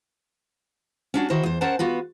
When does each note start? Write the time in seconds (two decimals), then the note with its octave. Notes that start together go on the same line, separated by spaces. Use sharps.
1.14 C#4 D4 F#4
1.30 D#3 E4 F#4 C5
1.43 E2 C5
1.61 C#4 A#4 C5 F#5 A5
1.79 B3 F4 F#4 B4